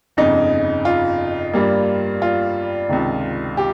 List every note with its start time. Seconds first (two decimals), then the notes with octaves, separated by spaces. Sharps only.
0.17 G1 F2 C#3 D#4
0.85 F4
1.53 G2 G3 A#3
2.22 F4
2.89 C#2 C3 D#3
3.57 G4